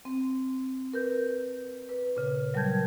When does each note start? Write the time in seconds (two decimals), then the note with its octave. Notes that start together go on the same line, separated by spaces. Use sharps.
0.05 C4
0.94 A#4 B4 G6
1.89 B4
2.17 A#2 C#3
2.54 F#3 G3 A#4 A5 G6 G#6